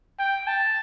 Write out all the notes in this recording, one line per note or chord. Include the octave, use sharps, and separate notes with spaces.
G5
A5